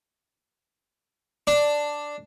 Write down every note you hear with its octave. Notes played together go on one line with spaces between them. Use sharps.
D4